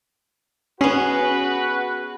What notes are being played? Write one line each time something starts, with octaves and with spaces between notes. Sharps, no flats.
B3 C#4 F#4 G#4 B4